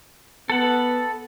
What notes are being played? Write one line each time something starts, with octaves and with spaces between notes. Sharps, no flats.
B3 A4 F#5